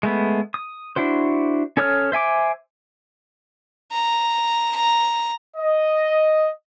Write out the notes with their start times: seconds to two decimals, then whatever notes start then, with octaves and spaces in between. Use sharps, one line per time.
0.03 G#3 A3 B3
0.54 D#6
0.96 D4 E4 F#4 C5
1.77 C#4 A4 C#5 D#6 F6
2.12 C5 E5 G#5 D6
3.92 A#5
4.76 A#5
5.57 D#5